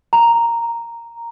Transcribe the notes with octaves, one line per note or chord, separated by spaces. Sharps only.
A#5